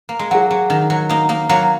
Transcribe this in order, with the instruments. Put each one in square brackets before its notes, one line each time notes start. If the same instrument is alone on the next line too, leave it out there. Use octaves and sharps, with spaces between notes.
[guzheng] A#3
G#3
[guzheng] F#3 [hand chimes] G#4 F#5
[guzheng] F#3
D#3
F#3
A#3 D#4
A#3 D#4
F#3 A#3